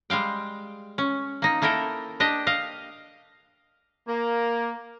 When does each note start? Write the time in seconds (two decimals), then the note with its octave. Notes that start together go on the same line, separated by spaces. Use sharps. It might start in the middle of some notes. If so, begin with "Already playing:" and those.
0.10 G3 G#3 F5 G5
0.98 C#4
1.42 A#3 D#4
1.62 A#3 E4 A4 A#4 G5
2.20 D4 G4 D#5
2.47 D#5 F5
4.06 A#3